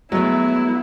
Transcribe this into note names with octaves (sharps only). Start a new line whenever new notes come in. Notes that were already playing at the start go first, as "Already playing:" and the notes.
F#3 G#3 A3 B3 E4